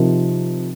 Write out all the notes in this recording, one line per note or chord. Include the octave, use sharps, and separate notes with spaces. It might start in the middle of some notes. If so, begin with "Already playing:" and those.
Already playing: C3 F3 C4 D#4 A#4